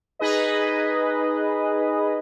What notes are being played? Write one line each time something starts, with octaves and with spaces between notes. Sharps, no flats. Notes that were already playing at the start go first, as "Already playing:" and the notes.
D#4 G#4 B4 D#5